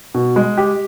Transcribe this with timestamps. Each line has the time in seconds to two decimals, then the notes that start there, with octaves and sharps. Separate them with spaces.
0.14 B2
0.36 G#3
0.58 G4